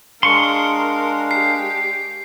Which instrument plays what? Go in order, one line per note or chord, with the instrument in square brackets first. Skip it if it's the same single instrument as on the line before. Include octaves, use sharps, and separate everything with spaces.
[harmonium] G#3 D4 F5 [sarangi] A#4 [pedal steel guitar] C6 C#6
[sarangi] G4 [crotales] C7